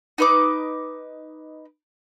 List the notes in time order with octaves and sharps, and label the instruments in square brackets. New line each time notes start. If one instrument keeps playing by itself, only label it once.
[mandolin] D#4 B4 D6